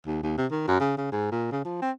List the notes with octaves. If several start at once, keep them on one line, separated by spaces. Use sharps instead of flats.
D#2
D#2
C3
D#3
F#2
C#3
C#3
G#2
A#2
C#3
F3
C4